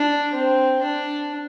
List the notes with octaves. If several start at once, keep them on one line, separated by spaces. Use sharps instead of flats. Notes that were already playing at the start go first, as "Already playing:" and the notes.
Already playing: D4
C4
D4